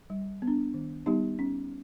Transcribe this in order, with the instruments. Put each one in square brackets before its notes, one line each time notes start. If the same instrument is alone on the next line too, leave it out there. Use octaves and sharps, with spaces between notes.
[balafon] G3
B3
D4
D#3
G3 B3 D#4 G4
C#4